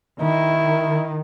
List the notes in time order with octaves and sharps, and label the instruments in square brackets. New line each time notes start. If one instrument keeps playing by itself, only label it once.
[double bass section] D#3 [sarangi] E4